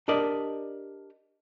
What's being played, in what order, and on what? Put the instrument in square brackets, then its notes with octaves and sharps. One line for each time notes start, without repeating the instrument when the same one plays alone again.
[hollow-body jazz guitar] D4 G4 A#4 D5 D#5